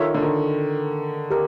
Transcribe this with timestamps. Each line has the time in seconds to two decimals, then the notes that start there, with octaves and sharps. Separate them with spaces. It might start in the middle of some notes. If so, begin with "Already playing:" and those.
Already playing: D#3 F4 A4 C#5 E5
0.15 D3
0.23 D#3
1.31 G4 A#4